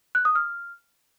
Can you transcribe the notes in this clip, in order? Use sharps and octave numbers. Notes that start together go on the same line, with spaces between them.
F#6
D#6
F6